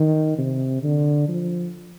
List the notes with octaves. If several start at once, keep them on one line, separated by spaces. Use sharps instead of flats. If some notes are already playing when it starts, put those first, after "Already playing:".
Already playing: D#3
C3
D3
F3